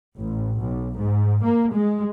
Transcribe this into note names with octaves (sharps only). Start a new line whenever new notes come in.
A1
B1
G#2
A#3
G#3